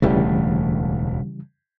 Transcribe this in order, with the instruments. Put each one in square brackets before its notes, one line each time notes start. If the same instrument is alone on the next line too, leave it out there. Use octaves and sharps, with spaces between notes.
[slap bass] E1 D2 A3 [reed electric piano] C#3 E3 G3